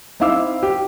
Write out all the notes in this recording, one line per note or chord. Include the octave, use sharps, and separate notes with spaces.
C4 D#4 E4 F5 D6 E6
G4